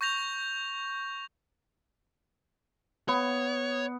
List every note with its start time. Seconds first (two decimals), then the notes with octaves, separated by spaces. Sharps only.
0.01 C#6 G6 A#6 F7
3.08 B3 C#5